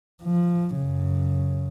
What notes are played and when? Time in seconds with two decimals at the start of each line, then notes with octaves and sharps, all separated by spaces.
0.23 F3
0.76 F#2 C#3